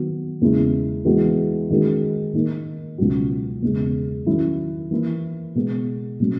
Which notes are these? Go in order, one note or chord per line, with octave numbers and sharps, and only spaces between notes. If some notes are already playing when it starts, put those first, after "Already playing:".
Already playing: D#3 F#3 B3 F#4
E2 C#3 G#3 C#4 E4
E3 G#3 B3 F#4
D#3 G#3 C#4 F#4
D#3 A#3 D#4
C#2 B2 F#3 C#4 F#4
E2 C#3 G#3
D#3 F#3 C#4 E4
E3 A#3 E4
B2 G#3 B3
B2 F#3 C#4